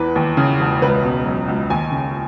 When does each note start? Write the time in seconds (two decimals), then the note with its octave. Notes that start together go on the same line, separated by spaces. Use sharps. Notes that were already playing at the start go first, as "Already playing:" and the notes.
Already playing: E2 E3 B4
0.16 D#2
0.37 C#3
0.60 E1
0.82 C#2 B4
1.04 B2
1.25 F#3
1.48 C#2
1.70 D#2 G#5
1.92 C#3